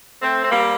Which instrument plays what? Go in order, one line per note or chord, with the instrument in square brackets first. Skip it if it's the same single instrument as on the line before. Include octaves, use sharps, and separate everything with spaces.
[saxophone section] A3 C4
C4
G3 A#3